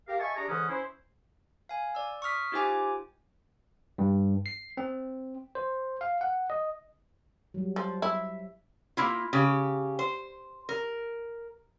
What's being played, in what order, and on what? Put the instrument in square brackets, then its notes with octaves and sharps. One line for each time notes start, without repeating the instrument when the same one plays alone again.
[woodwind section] G4 A#4 F5
D#5 E5 G#5 A5 C#6
D4 G4 G#4 A#5
G#2 D3 E3 C#4 F#5 D#6
C#4 E4 C5
[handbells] F5 G#5
D5 E6
C#6 D#6 F6 B6
D#4 F4 G4 C5 G#5 D6
[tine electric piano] G2
C7
C4
C5
F5
F#5
D#5
[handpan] F#3 G3
[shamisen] F3
[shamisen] E4 [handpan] E5
[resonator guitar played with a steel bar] A#3 E4 F4
C#3 G4
C5
A#4